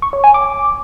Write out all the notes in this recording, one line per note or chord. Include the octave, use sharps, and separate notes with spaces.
C#6
C#5
G#5
D6